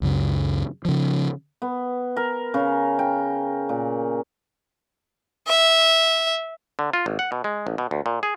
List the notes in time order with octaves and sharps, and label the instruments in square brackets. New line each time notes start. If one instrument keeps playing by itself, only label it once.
[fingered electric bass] C#2 F#2 C#3 F#3
C#3 F3
[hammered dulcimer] B3
A#4
C#3
G5
A#2
[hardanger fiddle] E5
[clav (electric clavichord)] D3
F4
G#1
F#5
B2
G#3
A1
B2
D2
A#2
G#4